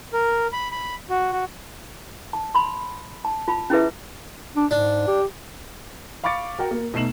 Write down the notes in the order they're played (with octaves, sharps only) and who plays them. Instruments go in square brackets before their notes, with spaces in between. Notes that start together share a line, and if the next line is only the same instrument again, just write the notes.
[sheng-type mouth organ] A#4
B5
B5
F#4
F#4
[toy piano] A5
B5 C6
A5
F4 A5 B5
C#4 E4 G#4 B4 E5
[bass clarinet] D4
[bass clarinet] G#2 [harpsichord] D4
[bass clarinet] G4
[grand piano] F5 B5 C#6 D6 A6 C#7
F#4 A#4 G5
A#3
B2 A3 D#4 C7 E7 F#7